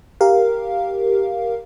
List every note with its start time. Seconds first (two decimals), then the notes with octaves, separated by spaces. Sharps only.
0.21 G4 A#4 F5